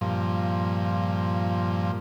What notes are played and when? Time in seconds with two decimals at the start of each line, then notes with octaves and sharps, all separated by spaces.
0.01 G2 A#2 F3